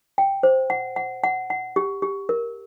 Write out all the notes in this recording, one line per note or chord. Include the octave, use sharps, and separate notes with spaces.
G5
C5
F#5
F#5
F#5
F#5
G4
G4
A#4